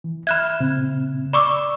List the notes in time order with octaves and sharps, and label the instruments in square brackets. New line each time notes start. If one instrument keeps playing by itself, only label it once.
[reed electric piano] E3
[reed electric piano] E5 F6 [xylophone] B5 F#6 G#6
[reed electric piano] A#2 C#3 C4
[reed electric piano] D5 E6 [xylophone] B5 C#6 D6